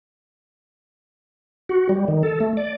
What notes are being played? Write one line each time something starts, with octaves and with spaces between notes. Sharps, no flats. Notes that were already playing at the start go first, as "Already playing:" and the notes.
F#4
G3
D#3
A4
A3
D5